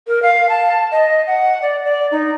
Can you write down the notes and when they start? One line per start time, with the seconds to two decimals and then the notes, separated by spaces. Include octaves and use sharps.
0.07 A#4
0.22 F5
0.49 A5
0.92 D#5
1.27 F#5
1.62 D5
1.85 D5
2.12 D#4